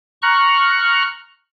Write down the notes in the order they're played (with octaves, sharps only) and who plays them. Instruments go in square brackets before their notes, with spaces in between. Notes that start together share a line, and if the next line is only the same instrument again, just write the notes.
[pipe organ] A#5 C#6 F6 F#6